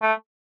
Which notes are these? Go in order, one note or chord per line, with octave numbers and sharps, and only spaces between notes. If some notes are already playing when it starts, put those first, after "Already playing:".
A3